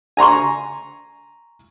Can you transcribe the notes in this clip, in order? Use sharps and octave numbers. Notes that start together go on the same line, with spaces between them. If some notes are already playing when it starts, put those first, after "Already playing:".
G#5 A#5 C6 C#6